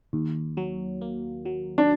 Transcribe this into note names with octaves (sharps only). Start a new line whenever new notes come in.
D#2
F#3
A#3
F#3
D4